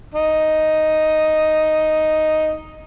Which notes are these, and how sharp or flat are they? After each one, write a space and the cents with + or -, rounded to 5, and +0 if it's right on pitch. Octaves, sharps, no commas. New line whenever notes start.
D#4 +0